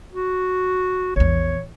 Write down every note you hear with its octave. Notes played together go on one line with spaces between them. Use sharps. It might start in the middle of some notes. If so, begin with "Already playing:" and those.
F#4
A#1 E2 C#5